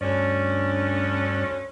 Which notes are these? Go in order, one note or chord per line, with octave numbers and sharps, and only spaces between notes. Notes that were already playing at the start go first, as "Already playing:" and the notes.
D2 G2 C#4 D5